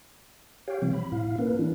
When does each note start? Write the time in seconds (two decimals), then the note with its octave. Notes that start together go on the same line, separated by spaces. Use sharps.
0.68 G4 C#5 F5 G5
0.82 C3 E3 F3 G3 C4
0.93 B5
1.12 A2 E4 F5
1.39 A#3 C#4 A#4 B4
1.59 E3 C#4 D4 E4